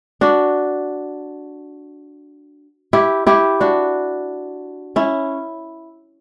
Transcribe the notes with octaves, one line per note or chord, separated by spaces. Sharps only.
D4 F#4
E4 G4
E4 G4
D4 F#4
C#4 E4